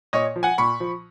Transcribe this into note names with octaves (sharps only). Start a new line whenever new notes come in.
A#2 C#5 D#5
F3
F#5 G#5
A#2 B5 C#6
F3